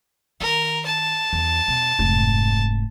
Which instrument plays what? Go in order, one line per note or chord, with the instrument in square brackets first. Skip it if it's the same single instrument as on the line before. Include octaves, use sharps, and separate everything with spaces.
[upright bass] D#3 [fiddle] A#4
[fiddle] A5
[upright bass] E2
B2
F1 G#2